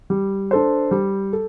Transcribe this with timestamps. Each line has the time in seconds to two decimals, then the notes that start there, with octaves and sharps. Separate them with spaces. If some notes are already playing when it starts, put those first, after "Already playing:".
0.10 G3
0.51 D4 A4 C5
0.91 G3
1.33 A4